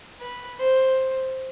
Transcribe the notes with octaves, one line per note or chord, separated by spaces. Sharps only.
B4
C5